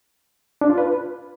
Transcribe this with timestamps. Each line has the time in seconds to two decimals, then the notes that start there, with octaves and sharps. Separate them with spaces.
0.61 D4
0.70 F4
0.78 B4